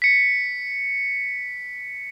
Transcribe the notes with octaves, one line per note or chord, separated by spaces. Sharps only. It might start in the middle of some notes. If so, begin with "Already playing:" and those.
B6 C#7